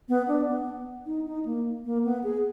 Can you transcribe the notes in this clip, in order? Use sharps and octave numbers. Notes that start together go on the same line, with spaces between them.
B3
D4
B3
D#4
D#4
A#3
A#3
B3
G#4